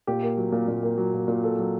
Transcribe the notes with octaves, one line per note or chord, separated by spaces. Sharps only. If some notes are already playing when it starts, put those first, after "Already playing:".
A#2 G4
A#3
F#3
A#2
A#2
A#3
F#3
A#2
A#2
A#3 A4
F#3